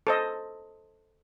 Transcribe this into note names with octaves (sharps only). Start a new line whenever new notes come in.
A4 C5 D#5